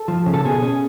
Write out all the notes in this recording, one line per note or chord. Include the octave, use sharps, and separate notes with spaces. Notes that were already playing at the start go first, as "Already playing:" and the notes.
Already playing: A4
F3
C#3
A4
B2 G#4
C#4